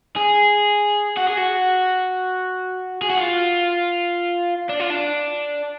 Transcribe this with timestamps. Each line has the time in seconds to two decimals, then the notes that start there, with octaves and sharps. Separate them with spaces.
0.16 G#4
1.17 F#4
1.27 G#4
1.37 F#4
3.02 G#4
3.10 F#4
3.18 F4
4.69 D4
4.80 F4
4.90 D4